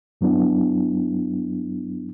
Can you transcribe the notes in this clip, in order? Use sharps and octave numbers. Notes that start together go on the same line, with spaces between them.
G2 F#3 B3 D4 E4